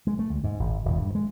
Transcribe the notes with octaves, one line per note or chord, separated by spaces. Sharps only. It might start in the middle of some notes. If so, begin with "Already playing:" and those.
G#3
A3
D2
G#2
G#1
D#1
G2
G#3